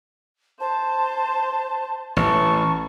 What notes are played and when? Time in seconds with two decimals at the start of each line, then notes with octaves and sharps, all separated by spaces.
0.60 C5 A5
2.17 A1 A5 C#6